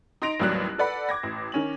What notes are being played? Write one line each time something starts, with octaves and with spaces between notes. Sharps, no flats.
D#4 C6 A#6 D7 F7
A1 D#2 F#3 G3 F#6
A4 B4 D5 F#5 B5
D6 G#6 A#6
A1
D#3 C#4 F#7